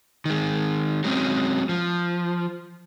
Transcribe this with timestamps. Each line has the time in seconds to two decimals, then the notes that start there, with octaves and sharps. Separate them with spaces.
0.25 D#3 G#3
1.04 F#3 G#3 C4 C#4
1.69 F3